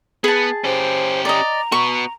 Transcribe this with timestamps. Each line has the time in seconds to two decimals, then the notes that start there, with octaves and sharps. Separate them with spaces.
0.24 B3 G#4 A5
0.64 C#4 G4 C5
1.25 D5 D#5 A#5
1.72 B3 F#4 C#6